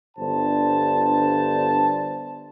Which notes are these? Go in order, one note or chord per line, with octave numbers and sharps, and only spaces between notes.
G1 D4 C5 A5